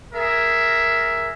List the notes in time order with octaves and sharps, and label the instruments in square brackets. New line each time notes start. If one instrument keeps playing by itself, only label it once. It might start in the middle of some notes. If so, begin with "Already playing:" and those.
[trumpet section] G#4 A#4 E5